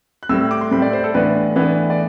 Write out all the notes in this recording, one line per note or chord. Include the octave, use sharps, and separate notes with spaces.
F#6
A2 G3 C4 E6
E6
D6
C6
A2 G3 C4 B5
D5
C5
A4
A2 E3 B3 D4 B4
A2 E3 B3 D4
D5